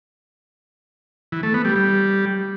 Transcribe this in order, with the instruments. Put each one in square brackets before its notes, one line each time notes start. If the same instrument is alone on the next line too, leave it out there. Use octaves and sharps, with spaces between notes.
[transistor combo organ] E3
A3
B3
G3
G3